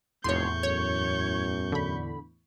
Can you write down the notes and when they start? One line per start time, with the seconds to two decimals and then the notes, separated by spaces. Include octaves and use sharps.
0.24 F1 E2 A2 C#5 C6 C#6 G6
0.63 F#2 C#5
1.72 D3 B5